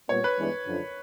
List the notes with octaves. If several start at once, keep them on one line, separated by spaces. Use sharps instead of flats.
A#2 G3 B3 C#5
B4
G2 E3 G#3 B3 D4
F#2 D3 F3